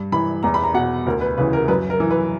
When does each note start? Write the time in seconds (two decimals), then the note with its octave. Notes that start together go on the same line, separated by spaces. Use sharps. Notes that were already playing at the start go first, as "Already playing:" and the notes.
Already playing: G2
0.12 E3 B5
0.43 E2 A#5
0.54 B5
0.64 A#5
0.74 B2 F#5
1.07 D2 A#4
1.21 B4
1.38 C#3 E3 B4
1.53 A#4
1.68 F#2 B4
1.90 A#4
2.00 E3
2.11 B4